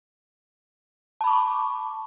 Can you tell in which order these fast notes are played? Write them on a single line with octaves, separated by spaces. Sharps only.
A5 B5 D6 C#6